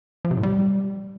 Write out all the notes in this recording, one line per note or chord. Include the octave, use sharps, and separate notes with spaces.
F3
C3
A2
G3